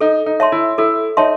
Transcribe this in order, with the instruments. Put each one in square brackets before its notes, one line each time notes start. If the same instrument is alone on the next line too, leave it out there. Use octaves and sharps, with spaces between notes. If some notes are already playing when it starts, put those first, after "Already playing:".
[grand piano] D#4 [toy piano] A4
[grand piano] D#4
[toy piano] C#5 E5 A5 C6
[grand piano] E4
[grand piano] E4 [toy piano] A4
[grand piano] D#4 [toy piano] C#5 E5 A5 C6